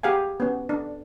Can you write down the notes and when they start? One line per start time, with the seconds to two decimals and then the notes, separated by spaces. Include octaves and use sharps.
0.03 G4 G#4 F5 F#5 G#5
0.40 B3 C#4
0.69 D4